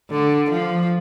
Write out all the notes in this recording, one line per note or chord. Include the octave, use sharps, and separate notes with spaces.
D3
F3